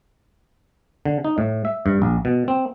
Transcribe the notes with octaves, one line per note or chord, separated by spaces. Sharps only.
D3
D#4
A2
E5
G2
A#1
B2
C4